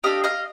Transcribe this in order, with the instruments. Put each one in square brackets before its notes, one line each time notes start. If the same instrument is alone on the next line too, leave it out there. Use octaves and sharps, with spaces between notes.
[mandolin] A3 D4 G4 D#5 F5
D#5 F5